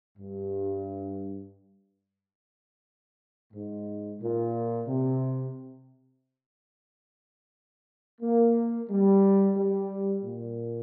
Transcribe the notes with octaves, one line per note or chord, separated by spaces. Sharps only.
G2
G#2
A#2
C3
A#3
G3
G3
A#2